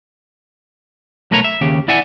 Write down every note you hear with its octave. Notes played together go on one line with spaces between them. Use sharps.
B1 A3 A#4 B4 C#5 A#5
E5
D#2 C#3 G4
E4 D5 E5 F#5 G#5